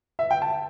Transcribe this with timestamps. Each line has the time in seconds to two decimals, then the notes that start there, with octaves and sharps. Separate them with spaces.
0.19 E5
0.31 G5
0.42 A5